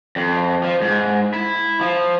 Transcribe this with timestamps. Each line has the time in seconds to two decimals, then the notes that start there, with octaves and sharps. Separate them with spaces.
0.16 F2
0.63 F3
0.82 G#2
1.34 E4
1.81 F3